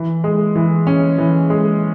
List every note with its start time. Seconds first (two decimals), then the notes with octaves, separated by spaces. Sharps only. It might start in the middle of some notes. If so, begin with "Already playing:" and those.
Already playing: E3
0.24 G#3
0.56 E3
0.87 C#4
1.18 E3
1.50 G#3